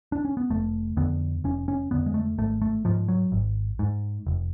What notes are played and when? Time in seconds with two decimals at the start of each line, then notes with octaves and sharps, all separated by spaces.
0.12 D4
0.25 C#4
0.37 B3
0.50 F1 A3
0.97 F2 D3 B3
1.44 F1 C#4
1.68 C#4
1.91 F2 D3 B3
2.06 G#3
2.14 A3
2.38 G#1 A3
2.62 A3
2.85 G#2 F3
3.08 F#3
3.32 G#1
3.79 G#2
4.27 F1